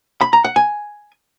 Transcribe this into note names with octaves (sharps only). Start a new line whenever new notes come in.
B5
A#5
F#5
G#5